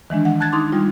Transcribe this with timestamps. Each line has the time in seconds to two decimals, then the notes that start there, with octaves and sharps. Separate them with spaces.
0.10 D#3 E3 G#3 D4
0.25 F#5
0.40 A5 F#6 G#6 A6
0.52 D#4 C6 D6
0.72 G3 D#4 F4